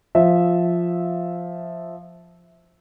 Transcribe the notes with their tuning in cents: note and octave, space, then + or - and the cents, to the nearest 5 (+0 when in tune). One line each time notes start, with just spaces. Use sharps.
F3 +0 E5 -10